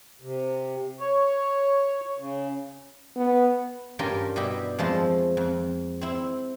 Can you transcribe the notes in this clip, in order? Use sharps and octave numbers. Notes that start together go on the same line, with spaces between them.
C3
C#5
C#3
B3
G2 C#4 F4 G4 A#4 G5
B2 G3 E4 G4
F2 F3 G#3 A3
F2
C4 E4